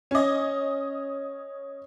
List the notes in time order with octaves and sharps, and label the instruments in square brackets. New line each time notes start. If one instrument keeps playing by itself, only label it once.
[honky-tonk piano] C#4 D#5